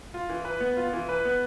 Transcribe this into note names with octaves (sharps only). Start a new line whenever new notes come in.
F4
E3
B4
B3
F4
E3
B4
B3